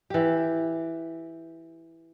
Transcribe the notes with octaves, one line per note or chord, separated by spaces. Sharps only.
E3 G4